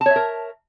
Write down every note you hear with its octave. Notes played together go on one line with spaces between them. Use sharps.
A#4 C#5 E5 A5